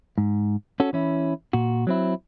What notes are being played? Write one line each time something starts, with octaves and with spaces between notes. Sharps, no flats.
G#2
C#4 F#4 A4
E3 C#4 E4
A#2 F#4
F#3 C4 E4